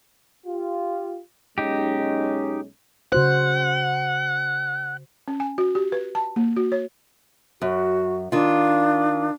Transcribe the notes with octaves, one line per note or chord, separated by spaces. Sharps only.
F4 G4
B1 G#3 C#4 D#4 G4
C#3 F#4 C5 F#5
C#4
G#5
F#4
G4
B4
A5
A#3
F#4
C#5
F#2 F#4
D#3 D4 F4